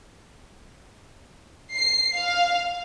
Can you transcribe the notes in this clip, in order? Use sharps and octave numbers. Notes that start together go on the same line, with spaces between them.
C7
F5